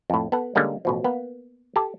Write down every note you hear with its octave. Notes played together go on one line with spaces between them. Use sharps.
F2 A2
B3 A4 F#5
D3 G3 G#3 A#3 C#4
A1 B2 F3
A#3 B3
G4 A4 A5